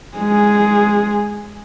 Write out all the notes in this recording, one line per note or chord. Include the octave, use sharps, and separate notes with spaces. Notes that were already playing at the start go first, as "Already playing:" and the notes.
G#3 G#4